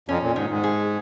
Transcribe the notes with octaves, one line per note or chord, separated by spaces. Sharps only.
F2 C#4
A#2
G#2 D#3
G#2
G#4